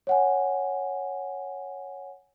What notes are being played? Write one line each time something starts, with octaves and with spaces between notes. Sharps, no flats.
C#5 F#5 G#5